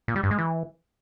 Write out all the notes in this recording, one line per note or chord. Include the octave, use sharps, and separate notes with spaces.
A#2
G3
G2
G#3
E3